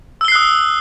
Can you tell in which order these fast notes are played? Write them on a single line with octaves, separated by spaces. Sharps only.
E6 G7 C7 F#6 D#6